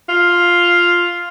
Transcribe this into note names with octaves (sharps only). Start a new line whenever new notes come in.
F4